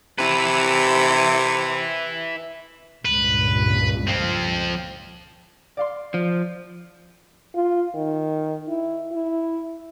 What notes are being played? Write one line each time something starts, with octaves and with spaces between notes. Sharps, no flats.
C3 E4 B4
C#2 G2 A#2 B4
F3 C4
D5 F5 C6
F3
F4
D#3
E4
E4